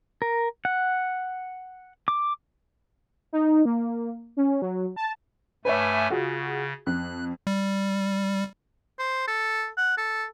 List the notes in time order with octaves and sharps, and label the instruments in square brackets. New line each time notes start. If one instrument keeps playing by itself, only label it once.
[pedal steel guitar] A#4
F#5
D6
[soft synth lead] D#4
A#3
C#4
F#3
A5
[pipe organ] G2 A3 G#5 [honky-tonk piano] B4 C#5 E5
[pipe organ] C#3 [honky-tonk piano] F4 F#4 G#4
[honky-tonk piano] F2 [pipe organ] F#6
[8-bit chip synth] G3
[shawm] C5
A4
F#5
A4